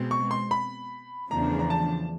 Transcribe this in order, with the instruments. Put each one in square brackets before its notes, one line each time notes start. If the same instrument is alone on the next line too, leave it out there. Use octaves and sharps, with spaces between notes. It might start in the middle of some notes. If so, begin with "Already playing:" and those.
Already playing: [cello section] B2 G#3 C4
[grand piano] C#6
C6
B5
[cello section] E2 C#3 F3 A3 D4 [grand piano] A#5
[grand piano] A#5
A5